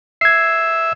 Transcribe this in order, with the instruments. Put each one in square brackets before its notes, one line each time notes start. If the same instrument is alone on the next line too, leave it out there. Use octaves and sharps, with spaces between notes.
[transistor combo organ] E5 [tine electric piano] G#6 C7